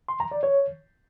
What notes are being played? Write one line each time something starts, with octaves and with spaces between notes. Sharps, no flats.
C6
A#5
D5
C#5